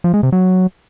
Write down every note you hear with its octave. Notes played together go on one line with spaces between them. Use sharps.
F3
G#3
C3
F#3